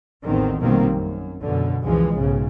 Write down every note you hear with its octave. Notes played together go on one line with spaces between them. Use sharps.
A1 E2 D#3 C4
A#1 B2 D#3 G3 A#3 C4
F#2
F#2 B2 D3
C#2 E3 F3 G#3
B1 G#2 C#3